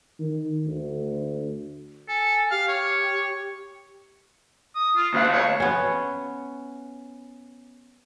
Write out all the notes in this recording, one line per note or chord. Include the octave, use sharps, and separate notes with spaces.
D#3
D2
A4 G#5
G4 F5
C#5
D#6
F4
D2 F5 F#5
C#5
B3 C#4